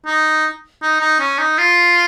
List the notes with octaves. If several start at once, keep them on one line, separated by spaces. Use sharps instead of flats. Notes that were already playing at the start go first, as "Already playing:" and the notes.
D#4
D#4
D#4
C#4
D#4
F4